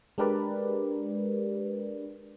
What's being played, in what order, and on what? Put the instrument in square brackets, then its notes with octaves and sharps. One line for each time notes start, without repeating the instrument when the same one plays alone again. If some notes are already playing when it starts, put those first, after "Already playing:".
[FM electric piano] G#3 D4 G4 A#4 B4 D5